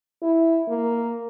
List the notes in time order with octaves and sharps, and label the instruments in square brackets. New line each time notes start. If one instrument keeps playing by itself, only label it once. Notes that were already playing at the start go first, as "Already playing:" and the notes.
[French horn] E4
A#3